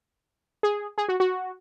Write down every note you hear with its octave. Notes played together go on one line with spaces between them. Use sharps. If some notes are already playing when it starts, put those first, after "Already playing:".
G#4
G#4
F#4
F#4